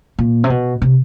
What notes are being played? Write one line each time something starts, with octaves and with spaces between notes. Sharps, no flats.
A#2
C3
B2
C3